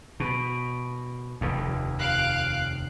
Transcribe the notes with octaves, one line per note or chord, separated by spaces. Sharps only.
B2
F1 D#2
F5 F#6 D7